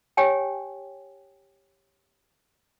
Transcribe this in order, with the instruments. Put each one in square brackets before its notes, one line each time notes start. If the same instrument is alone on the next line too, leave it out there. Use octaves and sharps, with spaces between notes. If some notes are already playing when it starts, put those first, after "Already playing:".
[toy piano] G4 C#5 G5 G#5